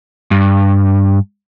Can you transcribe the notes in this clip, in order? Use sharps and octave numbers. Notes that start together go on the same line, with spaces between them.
G2